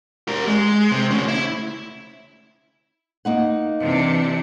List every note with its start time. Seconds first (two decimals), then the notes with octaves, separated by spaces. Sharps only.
0.28 G3 A#4
0.47 G#3
0.91 C3
1.10 C#3 A3
1.28 E4
3.25 A#3 D#4 F#5
3.81 C3 E3 D4